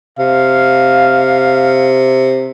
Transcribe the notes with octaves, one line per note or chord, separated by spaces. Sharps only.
C3 F5